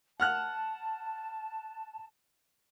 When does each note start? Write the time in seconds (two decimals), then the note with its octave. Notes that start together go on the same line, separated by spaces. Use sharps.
0.20 F#5 A5 F6 F#6